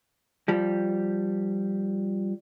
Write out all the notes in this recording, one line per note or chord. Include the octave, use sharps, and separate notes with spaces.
F3 G3